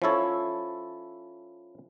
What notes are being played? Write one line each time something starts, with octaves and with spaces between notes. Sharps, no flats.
F3 C#4 E4 A4 C#5